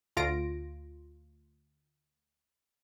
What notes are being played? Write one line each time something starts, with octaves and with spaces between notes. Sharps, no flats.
D2 F4 A#6 D7